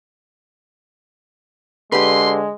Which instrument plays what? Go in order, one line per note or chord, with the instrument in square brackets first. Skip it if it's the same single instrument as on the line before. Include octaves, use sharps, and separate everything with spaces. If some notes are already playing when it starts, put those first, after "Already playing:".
[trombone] D3 [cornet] G#3 [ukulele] G4 B4 [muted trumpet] C6